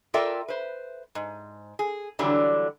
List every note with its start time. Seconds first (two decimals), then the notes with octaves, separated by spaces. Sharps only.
0.14 F4 A4 A#4 D5 E5 G5
0.48 B4 C5
1.15 G#2
1.79 G#4
2.19 D3 E3 F#3 G3 D4